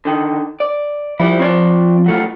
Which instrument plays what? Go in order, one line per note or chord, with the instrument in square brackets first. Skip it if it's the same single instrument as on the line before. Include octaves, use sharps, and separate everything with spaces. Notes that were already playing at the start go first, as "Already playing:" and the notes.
[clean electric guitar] D3 D#3
D5
[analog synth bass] F3 [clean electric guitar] G3 E4
[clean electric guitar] C4 C#5 D5
F#3 A3 F4